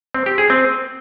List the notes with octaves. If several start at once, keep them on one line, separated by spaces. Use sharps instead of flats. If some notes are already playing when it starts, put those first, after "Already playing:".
C4
G4
G#4
C4